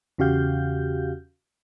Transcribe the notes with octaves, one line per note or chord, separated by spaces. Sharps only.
E2 C#3 F#4 G4 F5 G6